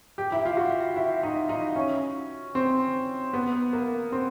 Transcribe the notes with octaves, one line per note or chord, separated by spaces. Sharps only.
G4
E4
F4
F#4
E4
D#4
D#4
C#4
C4
B3
A#3
C4